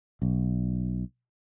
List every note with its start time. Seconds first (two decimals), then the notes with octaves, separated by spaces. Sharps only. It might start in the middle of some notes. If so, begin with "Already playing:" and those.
0.22 B1